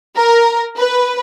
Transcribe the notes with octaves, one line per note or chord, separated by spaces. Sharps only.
A#4
B4